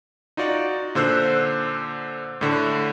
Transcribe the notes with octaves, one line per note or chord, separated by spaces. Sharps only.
D#4 F4 F#4 D5
A#2 D3 C5 E6 F#6
A2 D3